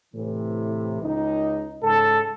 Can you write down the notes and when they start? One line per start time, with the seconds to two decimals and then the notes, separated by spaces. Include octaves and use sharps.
0.14 A2 C3 E3
1.02 C#2 D#4
1.83 G#2 C#3 A4